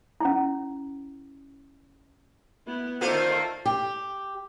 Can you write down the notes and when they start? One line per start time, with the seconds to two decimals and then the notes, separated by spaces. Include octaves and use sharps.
0.20 C#4 E4
2.66 B3 E4
3.01 D3 D#3 A3 A#3 F4 C5
3.66 G4